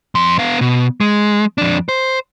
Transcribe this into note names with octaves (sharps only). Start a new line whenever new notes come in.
F2 C6
B3 F5
B2
G#3
F2 D4
C5